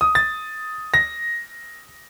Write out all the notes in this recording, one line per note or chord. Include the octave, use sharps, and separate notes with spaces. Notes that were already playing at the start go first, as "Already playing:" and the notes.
D#6
A6
A#6